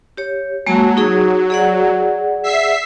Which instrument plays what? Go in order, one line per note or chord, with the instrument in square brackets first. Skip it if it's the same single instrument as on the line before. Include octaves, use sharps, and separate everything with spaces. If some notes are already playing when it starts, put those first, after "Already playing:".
[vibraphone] G4 C#5
[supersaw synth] F#3 [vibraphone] G#3 A#3 A5
[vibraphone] D#4 G#4
G#4 D5 F#5
[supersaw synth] E5 B6 C7